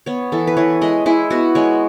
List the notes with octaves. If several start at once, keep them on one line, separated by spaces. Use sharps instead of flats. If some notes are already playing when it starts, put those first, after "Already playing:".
B3 C#5
E3 A4
B4
E3 C#5
G#3 D#5
G#3 E4
B3 F#4
G#3 C#5